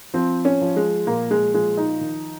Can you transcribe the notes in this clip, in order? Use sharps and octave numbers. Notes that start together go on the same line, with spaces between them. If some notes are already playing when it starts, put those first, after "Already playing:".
F3 C4
C#4
F3
G#3
A#2 A#3
G#3
F3 G#3
D#4
D#3